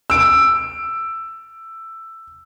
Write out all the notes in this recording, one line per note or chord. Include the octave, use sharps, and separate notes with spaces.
E6 D7